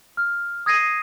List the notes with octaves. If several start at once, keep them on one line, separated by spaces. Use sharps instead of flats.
F6
D#6 G#6 A#6 C7 D#7